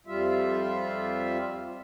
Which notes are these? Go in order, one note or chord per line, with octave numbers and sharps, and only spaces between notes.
F2 G3 F4 E5